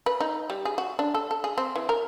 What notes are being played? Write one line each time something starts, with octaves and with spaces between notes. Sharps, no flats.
B4
D#4
G3
G#4
F#4
D4
A4
A4
G#4
C4
E3
A#4